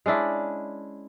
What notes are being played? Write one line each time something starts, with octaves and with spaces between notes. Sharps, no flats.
G#3 C#4 D4 E4